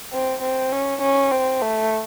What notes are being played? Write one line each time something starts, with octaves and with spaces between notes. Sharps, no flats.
C4
C4
C#4
C#4
C4
A3